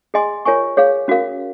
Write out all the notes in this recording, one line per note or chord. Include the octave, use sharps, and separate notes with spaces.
G#4 D#5 G#5 C6
F4 A#4 C#5 G#5 C#6
G#4 C#5 F5
C#4 F#4 A#4 F5